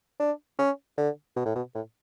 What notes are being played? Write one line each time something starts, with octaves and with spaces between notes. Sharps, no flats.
D4
C#4
D3
B2
A2
B2
A2